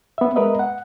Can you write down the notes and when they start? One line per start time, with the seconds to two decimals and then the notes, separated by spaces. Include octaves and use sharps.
0.18 B3 E5
0.36 G#3 B3 A#4 B4 D#5 E5
0.59 F#5